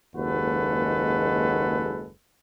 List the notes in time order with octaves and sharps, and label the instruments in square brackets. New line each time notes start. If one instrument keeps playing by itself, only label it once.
[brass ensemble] F#1 D#2 G#3 F#4 A4 B4